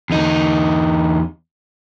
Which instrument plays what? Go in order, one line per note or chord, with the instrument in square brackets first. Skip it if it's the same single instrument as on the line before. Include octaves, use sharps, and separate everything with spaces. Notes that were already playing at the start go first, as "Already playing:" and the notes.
[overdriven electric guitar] E2 D#4